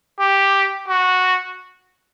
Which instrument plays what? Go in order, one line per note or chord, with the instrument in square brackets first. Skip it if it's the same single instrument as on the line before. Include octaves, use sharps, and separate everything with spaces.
[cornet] G4
F#4